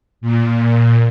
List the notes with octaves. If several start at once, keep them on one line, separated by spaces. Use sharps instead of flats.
A#2